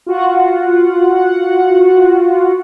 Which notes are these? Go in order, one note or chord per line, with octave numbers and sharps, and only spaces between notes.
F4 F#4 F#5